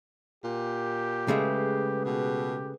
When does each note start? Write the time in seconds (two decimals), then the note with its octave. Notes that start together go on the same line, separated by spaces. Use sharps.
0.44 A#2 G4
1.28 C#3 G#3 A3 G#4 B4
2.06 B2 G4